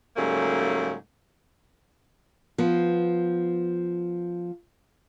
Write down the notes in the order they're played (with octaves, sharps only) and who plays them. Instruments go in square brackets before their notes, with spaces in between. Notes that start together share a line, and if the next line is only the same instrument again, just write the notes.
[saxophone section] G#2 C#3 F#3 G3 A3 A#3
[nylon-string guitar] F3 B3